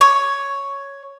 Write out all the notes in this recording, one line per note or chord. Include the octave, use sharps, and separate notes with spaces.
C#5